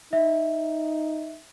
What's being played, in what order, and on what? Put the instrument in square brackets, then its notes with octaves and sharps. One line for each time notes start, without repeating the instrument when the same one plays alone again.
[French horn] D#4 [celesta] E5